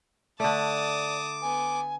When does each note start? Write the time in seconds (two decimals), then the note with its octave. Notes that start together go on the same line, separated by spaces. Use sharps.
0.40 D3 A3 D5 A5 D6 D#6
1.42 B3 G#5